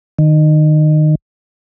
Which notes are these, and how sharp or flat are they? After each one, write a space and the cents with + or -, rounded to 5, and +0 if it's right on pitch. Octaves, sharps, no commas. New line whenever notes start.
D#3 -20